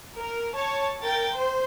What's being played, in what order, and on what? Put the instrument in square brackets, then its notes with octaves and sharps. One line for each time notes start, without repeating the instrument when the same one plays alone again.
[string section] A#4
C#5 A5
A#4 G5 G6 A6
C5